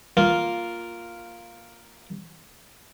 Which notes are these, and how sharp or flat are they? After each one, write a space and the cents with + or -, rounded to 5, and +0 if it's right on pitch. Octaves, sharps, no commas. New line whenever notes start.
A#3 +0 F4 +0